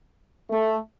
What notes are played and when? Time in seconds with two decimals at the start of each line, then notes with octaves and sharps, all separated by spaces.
0.50 A3